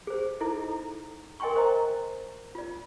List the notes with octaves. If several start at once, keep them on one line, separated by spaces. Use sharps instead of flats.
G#4 C5
D#4 E4 G#4 A4 D#5
E4 A4
A#4 D#5 G5 G#5 C6 C#6
A#4 C5 D#5 A#5
F4 D5